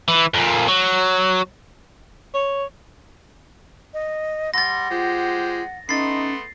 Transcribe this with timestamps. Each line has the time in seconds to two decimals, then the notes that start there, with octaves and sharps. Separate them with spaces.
0.08 E3
0.34 F2 A#2
0.68 F#3
2.34 C#5
3.94 D#5
4.54 G3 F#5 C6 A6 A#6
4.90 G#3 F4 G4 C5
5.89 A3 B3 C#4 D#4 C6 A6 C7